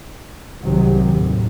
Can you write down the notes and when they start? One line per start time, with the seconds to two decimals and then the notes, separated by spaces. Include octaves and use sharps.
0.61 C2 G#2 C3 D#3 F#3
1.10 D#2 A2